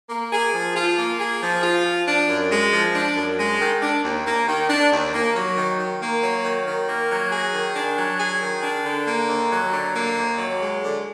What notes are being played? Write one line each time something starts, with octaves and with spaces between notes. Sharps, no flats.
A#3
G#4
F3
F4
A#3
G#4
F3
F4
F3
D4
F#2
G#3
F3
D4
F#2
G#3
D#3
D4
D#2
A#3
D#3
D4
D#2
A#3
F#3
D#3
D#3
A#3
F#3
D#3
D#3
A#3
F#3
G#4
D#3
D4
F#3
G#4
D#3
D4
D3
A#3
D#2
F#3
D3
A#3
D#2
F#3
G#3
D3